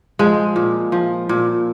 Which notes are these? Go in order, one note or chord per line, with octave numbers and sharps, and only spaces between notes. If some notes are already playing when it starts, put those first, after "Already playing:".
F3 G#3
A#2
F3
A#2